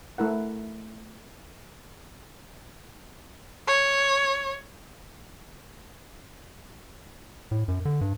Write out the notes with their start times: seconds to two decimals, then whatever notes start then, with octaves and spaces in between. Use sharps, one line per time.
0.18 A3 E4 A#4 F#5
3.67 C#5
7.51 A2
7.68 F#2
7.85 D3
8.01 G2